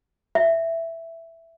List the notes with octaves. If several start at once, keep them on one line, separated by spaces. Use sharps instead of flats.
E5